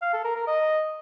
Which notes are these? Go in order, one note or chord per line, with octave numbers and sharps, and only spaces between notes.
F5
A4
A#4
A#4
D#5